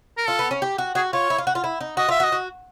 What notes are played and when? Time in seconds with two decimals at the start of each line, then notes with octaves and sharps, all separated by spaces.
0.17 A#4
0.28 F4 A4
0.39 B3
0.51 C#4
0.62 G4
0.78 F#4
0.95 F#4 G#4
1.13 F4 C#5
1.30 E4
1.38 F4
1.47 F#4
1.55 F4
1.64 E4
1.81 D#4
1.97 F#4 D#5
2.09 F4 E5
2.20 F#4
2.24 D#5
2.32 F#4